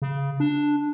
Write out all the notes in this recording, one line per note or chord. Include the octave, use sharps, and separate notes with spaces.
C#3
D4